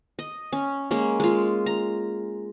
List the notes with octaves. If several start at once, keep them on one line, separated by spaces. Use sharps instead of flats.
D#5
C#4
G#3 A#3 C#4
G#3 F4
A#5